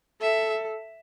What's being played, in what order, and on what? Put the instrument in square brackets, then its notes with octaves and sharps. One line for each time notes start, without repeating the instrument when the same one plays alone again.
[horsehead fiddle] A4 [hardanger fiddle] E5